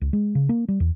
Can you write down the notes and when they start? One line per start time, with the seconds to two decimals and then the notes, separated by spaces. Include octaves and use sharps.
0.01 C#2
0.13 G#3
0.35 C#3
0.49 A#3
0.68 G3
0.80 E2